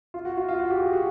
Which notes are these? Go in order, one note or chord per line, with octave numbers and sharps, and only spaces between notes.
F4
F#4
F4
F4
F#4
G4
G#4
F#4